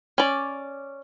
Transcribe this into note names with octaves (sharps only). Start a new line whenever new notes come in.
C#4 D5